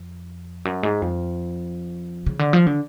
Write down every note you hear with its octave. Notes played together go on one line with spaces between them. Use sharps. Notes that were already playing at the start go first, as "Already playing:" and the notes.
Already playing: F2
F#2
G#2
F2
C#3
D3
F3
D3